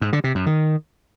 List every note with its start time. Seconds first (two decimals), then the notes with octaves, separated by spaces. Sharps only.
0.01 G#2
0.13 D3
0.24 C3
0.35 F#2
0.46 D#3